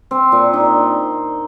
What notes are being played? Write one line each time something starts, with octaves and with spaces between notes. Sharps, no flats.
C4
A#2
D#4